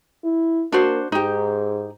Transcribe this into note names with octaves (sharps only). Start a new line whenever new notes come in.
E4
A#3 D4 F#4 C5
G#2 D#4 G4